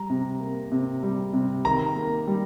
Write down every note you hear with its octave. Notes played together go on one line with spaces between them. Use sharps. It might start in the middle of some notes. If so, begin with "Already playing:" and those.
Already playing: G3 A#5
C3
A#3
C3
G3
C3
D#3 A#5
A#3
G3